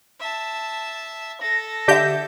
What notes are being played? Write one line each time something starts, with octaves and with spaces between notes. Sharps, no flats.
E5 A5
A4 A#6
D3 G4 D#5 E5 G6